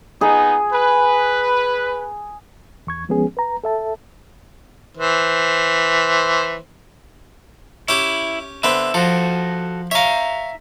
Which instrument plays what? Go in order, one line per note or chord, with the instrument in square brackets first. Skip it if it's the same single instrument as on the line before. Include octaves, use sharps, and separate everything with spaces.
[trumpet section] B3 D#4 [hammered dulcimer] G#4
[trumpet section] B4
[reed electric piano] E2 C#6 G#6
D2 F3 G#3 B3 C#4 G#4
B4 A#5
A4 E5 A5
[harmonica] E3 C5
[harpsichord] C#4 G4 [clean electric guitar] E4
[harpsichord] D3 B3 C4 [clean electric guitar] E5
[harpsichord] F3 [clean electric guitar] F#4 A4
[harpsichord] C#5 F5 [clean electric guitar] E5 A#5